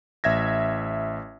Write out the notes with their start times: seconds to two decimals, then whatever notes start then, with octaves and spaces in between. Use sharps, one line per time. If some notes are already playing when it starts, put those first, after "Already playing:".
0.24 A1 E5 G#6 A#6